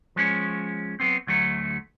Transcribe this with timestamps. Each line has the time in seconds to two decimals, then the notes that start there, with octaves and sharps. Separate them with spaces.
0.16 F3 G#3 C#4 C#5
1.00 F#3 B3 C4
1.27 D2 F#3 A3